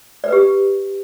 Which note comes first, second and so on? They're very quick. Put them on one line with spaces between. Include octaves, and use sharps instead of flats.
D5 B4 G4